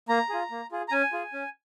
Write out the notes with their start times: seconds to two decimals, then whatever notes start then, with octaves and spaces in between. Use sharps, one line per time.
0.09 A#3 A#5
0.29 F4 G#4
0.51 A#3
0.71 F4 G#4
0.88 A#5
0.92 C#4 G#5
1.13 F4 G#4
1.33 C#4